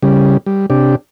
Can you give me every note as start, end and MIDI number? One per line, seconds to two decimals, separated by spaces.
0.03 0.37 49
0.03 0.37 55
0.46 0.66 55
0.70 0.95 48
0.70 0.95 62
0.70 0.95 67